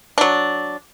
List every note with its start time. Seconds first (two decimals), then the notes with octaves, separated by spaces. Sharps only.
0.18 F#3 D4